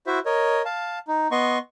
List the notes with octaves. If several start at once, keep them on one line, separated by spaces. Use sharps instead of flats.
E4 F#4 C5 E5
A#4 C#5 D#5
F5 A5
D#4
B3 D#5 C6 C#6